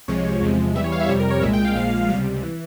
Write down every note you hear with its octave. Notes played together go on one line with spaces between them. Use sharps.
C2 C3 F3 G#3 C#5
E2 C3 F3 G#3
E2 E3 G3 E5
C#5
F5
E5
F2 C3 G3 C#5
A#4
C#5
C2 A#2 G#3 E5
G5
F5
A#1 A#2 F3 G#3 F5
C#2 C3 G3
E3